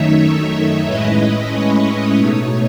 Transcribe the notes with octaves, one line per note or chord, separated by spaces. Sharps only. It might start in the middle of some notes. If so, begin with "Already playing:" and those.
Already playing: F#2 D#3 A3 D#4 C#5 E5
A2 G#3 C#4 E4 B4 D#5
C#5
C#5
B2 A3 D#4